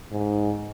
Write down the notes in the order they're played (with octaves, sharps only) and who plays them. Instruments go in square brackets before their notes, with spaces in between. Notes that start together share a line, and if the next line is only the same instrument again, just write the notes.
[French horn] G#2